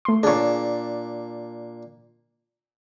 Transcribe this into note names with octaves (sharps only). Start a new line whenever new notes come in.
A3 C6
A#2 D4 G#4 C#5